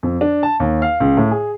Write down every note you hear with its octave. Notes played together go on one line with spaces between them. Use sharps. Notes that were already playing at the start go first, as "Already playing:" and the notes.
F2
D4
A5
D#2
F5
C#2
A2
G#4